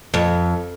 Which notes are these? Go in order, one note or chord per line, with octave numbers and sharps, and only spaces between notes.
F2